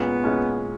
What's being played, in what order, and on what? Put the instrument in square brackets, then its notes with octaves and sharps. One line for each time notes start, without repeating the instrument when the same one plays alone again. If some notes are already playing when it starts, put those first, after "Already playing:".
Already playing: [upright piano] A#2 G#3 C#4 [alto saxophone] B3
[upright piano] A#2 G#3 C#4